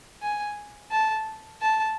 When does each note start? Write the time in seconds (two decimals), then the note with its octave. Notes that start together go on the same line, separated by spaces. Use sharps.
0.22 G#5
0.91 A5
1.62 A5